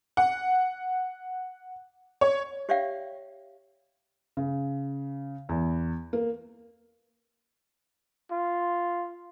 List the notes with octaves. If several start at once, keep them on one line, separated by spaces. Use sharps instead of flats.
F#5
C#5
G4 C#5 D5 E5 F5 G5
C#3
E2
A#3
F4